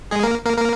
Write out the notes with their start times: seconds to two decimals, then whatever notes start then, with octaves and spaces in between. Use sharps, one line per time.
0.11 G#3 G#4
0.23 A#3 A#4
0.45 A#3 A#4
0.57 A#3 A#4